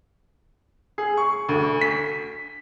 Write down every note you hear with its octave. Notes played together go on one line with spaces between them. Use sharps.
G#4
C#6
D2
B6